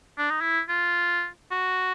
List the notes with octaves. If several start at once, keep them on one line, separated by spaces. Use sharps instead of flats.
D4
D#4
E4
F4
F#4